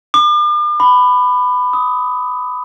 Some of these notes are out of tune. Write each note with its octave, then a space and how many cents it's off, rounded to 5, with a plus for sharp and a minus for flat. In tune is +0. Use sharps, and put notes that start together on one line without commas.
D6 +40
B5 +15
D#6 +20